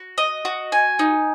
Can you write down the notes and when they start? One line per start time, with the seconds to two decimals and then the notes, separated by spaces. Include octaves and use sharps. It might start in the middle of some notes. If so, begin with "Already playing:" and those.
Already playing: F#4
0.18 D#5
0.45 F#4
0.72 G#5
0.99 D#4